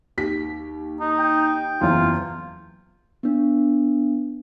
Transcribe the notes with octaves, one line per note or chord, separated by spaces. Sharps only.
D#2 G4 B6
D#4
G5
F#1 E2 F4
B3 D4